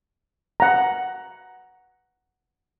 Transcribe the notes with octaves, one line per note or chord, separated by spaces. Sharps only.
F#5 A#5